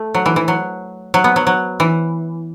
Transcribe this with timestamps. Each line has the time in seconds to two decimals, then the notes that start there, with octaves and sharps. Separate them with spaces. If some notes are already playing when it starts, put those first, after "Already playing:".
Already playing: A3
0.15 F#3
0.26 E3
0.36 E3
0.48 F#3
1.14 F#3
1.24 B3
1.36 F#3
1.47 F#3
1.80 E3